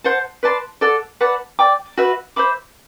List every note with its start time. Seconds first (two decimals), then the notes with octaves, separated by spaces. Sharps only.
0.04 C5 F#5 A5
0.43 B4 D5 A5 C6
0.81 A4 D5 F#5
1.21 B4 D5 F#5 A5
1.59 D5 G5 D6
1.97 F#4 B4 E5
2.36 C5 E5 B5 D6